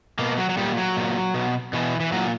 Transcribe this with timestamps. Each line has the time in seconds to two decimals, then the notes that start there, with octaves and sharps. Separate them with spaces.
0.19 B2 A#3
0.38 F#3
0.49 F#3
0.57 A#2 G3
0.77 F#3
0.97 A#2
1.34 B2
1.73 B2 E3
2.00 E3
2.12 A#2 F#3